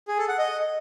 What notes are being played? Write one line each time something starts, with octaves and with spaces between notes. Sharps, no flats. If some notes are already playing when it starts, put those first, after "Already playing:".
G#4
A4
F#5
D#5